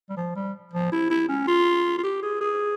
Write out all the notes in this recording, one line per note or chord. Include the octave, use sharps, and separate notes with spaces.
G3
F3
G3
F3
E4
E4
C#4
F4
F4
G4
G#4
G#4